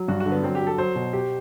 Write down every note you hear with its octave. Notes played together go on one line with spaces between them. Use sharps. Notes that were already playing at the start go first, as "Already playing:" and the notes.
Already playing: F#3
G2 F#4
F#4
D3
B3
F#3 C4
G4
F#3
A4
F#3 C5
B2
G4